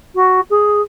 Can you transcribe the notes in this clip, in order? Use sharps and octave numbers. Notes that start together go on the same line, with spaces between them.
F#4
G#4